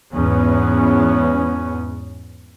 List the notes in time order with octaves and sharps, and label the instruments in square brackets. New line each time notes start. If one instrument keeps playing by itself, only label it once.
[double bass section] E2 G#2 B3 C#4